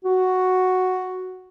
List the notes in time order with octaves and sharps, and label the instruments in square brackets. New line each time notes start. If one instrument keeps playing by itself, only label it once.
[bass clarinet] F#4